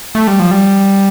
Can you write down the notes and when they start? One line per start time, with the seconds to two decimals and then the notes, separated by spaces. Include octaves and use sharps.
0.15 A3
0.27 G3
0.40 F3
0.51 G3